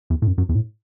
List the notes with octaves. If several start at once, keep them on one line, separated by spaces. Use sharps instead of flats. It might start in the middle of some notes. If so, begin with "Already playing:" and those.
E2
A2
F#2
F#2
E2
A2